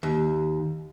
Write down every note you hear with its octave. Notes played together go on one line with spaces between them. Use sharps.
D#2